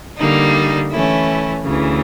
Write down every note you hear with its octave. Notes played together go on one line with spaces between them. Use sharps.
D3 G3 A#3 D#4
E3 A3 C#4 E4
D2 C#3 E3